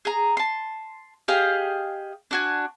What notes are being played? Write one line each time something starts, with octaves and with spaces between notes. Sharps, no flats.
G#4 A#5
A5 C6
G4 G#4 D#5 F5
D4 F#4 G#5